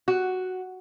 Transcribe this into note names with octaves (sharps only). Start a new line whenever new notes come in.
F#4